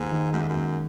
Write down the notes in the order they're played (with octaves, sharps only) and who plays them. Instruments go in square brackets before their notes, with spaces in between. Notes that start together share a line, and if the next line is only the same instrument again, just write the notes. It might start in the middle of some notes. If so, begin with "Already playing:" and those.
Already playing: [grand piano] D#2 [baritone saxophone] G#2
[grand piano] D#3
[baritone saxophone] F#2 [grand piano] G#3
[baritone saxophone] E2
F#2
[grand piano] D#2